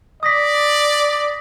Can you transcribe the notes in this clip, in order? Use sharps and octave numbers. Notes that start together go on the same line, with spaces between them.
D5 D#6 A#6 B6